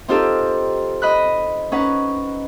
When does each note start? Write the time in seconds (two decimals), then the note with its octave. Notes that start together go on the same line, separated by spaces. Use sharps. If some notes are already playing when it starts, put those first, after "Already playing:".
0.08 C4 D#4 F4 G4 A4
1.02 D#5 B5 F#6
1.72 C#4 D#4 B4 F#5